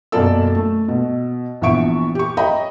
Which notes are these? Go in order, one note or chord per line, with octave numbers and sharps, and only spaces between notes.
F#2 B2 A#3 A4 D5 E6
A3
B2
A#1 E3 B3 E5 C#6 D7
G4 C#6
C#5 D#5 E5 G5 A#5 B5